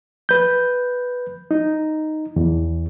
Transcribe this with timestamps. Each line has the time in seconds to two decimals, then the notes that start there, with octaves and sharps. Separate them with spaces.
0.29 B4 G6
1.51 D#4
2.36 E2